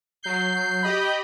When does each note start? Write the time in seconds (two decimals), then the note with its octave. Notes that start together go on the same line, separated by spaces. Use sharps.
0.23 F#3 G6 C7
0.83 G4 D#5 B5